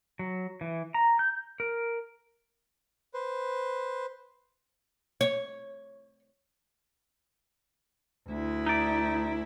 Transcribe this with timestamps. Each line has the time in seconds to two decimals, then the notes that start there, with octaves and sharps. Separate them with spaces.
0.19 F#3
0.61 E3
0.94 A#5
1.19 G6
1.60 A#4
3.14 B4 C5
5.21 C#5
8.28 D2 E4
8.66 D#4 D5